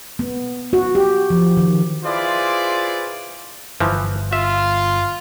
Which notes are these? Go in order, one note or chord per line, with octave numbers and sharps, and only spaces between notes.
B3
F#4
G4
F3
D#3
E4 F4 G#4 B4 C5 D5
G1 E3 F3
F4 E5